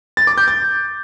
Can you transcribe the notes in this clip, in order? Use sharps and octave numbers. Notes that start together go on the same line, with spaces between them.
A6
D6
G6
A6